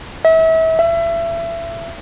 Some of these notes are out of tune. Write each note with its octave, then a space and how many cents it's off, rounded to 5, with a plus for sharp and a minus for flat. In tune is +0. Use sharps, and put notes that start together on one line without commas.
E5 -35
E5 +30